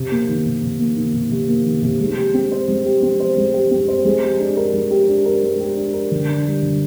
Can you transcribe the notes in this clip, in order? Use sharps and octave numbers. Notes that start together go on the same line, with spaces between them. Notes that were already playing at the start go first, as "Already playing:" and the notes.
Already playing: C3
A#3
D#3
C3
C3
A#3
D#3
C3
C3
A#3
D#3
C3
G#3
G4
C4
C5
G#3
G4
C4
C5
G#3
G4
C4
C5
G#3
G4
D4
A#4
G#3
G4
D4
A#4
G#3
G4
D4
A#4
D3
D4
G3
D3